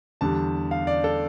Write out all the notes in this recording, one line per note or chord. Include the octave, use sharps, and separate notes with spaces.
E2 D3 G3 A5
F5
D5
A4